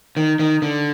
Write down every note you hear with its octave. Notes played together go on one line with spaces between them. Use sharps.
D#3
D#3
D3